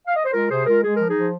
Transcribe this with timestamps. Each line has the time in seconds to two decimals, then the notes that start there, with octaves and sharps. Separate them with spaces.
0.07 F5
0.16 D#5
0.25 C5
0.33 G#3 F4 A#4
0.50 C3 G#4 C5
0.66 G#3 F4 A#4
0.83 G#3 G#4
0.96 F3 A#4
1.08 D#4 G#4
1.16 F3